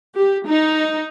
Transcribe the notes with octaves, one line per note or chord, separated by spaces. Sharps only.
G4
D#4